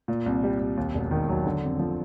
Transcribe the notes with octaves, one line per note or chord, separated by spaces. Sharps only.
A#2
C2
G3
C2
D#2
E1
D#3
F#3
D3
F2
F3